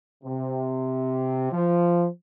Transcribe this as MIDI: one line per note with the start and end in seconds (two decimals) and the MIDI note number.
0.24 1.50 48
1.52 2.06 53